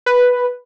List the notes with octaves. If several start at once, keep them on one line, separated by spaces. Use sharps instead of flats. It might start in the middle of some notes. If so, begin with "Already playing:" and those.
B4